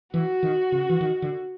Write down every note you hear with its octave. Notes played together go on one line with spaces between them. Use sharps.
E3 F#4
D#3
C#3
E3
D#3
D3